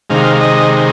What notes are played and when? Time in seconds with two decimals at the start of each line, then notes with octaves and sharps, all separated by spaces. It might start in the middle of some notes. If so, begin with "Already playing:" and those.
0.10 C3 D#3 G#3 F5
0.41 D#5